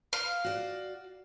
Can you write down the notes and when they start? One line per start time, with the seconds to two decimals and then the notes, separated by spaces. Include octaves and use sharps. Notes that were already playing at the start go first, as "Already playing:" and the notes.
0.13 F5
0.44 F#4 D5